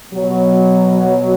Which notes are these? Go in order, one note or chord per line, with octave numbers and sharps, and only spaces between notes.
B2 F#3